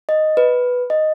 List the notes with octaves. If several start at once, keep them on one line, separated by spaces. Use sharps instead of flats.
D#5
B4
D#5